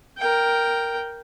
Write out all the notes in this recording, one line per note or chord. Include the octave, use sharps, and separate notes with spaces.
A#4 G5